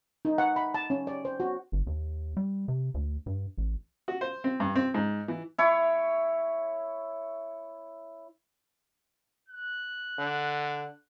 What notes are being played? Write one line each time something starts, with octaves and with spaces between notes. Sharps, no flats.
D#4
F#5
B5
A5
C#4
D5
C5
F#4
G1
D#2
G3
C3
D2
G2
A1
F#4
C5
C4
G2
C4
G#2
E3
E4 C#5
F#6
D3